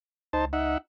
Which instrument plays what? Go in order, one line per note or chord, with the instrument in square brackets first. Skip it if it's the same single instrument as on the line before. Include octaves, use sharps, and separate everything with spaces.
[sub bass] C#2 [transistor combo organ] D#4 C5 A5
[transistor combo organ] D#4 E5 F#5